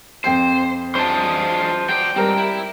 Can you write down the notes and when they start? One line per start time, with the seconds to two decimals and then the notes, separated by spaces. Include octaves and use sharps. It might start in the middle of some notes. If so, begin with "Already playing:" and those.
0.24 F2 C5 G5 C7
0.95 F#2 G#3 D4 C5 A5
1.89 F#3 C5 D5 G5
2.16 G#2 G3 C4 A#4
2.37 E4